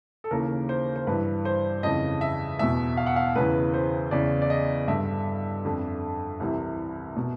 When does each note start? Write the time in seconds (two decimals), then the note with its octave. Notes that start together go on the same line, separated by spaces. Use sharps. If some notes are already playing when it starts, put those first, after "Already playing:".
0.24 A4
0.31 D#2 C#3 E3 A#4
0.69 C5
0.96 C5
1.07 G2 E3 B4
1.45 C5
1.83 F2 C#3 E3 D#5
2.21 E5
2.59 E2 B2 E5
2.97 F5
3.06 F#5
3.16 F5
3.36 E2 C#3 E3 B4
3.74 C5
4.11 E2 C#3 E3 D5
4.42 D5
4.50 D#5
4.88 G2 D3 E5
5.65 F2 D3
6.40 C2 C3 E3
7.16 B2